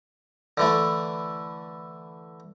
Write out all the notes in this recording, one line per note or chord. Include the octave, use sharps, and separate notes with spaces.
D3 E3 A3